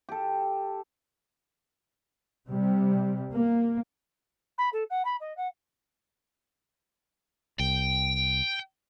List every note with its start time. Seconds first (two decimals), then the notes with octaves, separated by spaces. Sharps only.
0.09 G4 A4
2.48 C3 G3
3.33 A#3
4.58 B5
4.72 A4
4.90 F#5
5.05 B5
5.20 D#5
5.37 F#5
7.59 C2 G5